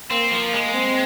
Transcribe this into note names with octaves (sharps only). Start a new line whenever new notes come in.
A#3 C4
F3
G#3
C4